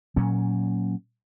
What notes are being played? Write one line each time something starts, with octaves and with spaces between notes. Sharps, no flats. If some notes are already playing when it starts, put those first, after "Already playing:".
A#2 F#3 C#4